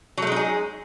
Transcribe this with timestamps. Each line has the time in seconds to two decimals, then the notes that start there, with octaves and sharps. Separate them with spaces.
0.18 F#3
0.22 A3
0.27 G#3
0.32 D#4
0.36 G#4